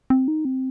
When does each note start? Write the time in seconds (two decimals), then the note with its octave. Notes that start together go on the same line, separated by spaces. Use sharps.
0.10 C4
0.28 D#4
0.45 C4